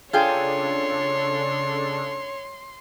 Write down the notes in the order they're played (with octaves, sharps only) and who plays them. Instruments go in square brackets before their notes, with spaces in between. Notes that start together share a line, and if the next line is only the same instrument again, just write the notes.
[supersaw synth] C#3 D4 A4 [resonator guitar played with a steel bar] F4 G#4 G5 [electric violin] C#5 [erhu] C6